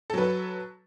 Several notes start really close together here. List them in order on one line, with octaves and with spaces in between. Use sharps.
A4 F#3 B4